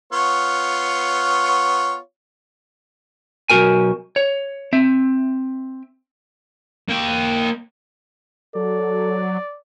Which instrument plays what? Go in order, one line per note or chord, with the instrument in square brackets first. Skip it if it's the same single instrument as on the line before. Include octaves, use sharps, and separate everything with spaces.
[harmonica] B3 F4 C#5
[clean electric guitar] B1 F#3 F#4 A#4 G#5
C#5
C4 E5
[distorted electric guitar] A#3 G5
[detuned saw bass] F#3 [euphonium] A4 [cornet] D5